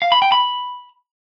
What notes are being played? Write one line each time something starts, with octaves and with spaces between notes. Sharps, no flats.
F5
B5
G5
B5